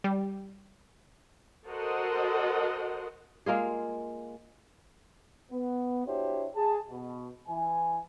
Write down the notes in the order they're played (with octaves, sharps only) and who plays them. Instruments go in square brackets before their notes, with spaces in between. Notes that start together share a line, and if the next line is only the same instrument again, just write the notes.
[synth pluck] G3
[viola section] F#4 A4 A#4 C5 D#5 F#5
[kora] G#3 A#3 F4 G#4
[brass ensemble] B3
D4 E4 F#4 G4 C5 C#5
G#4 A5
B2
E3 G#5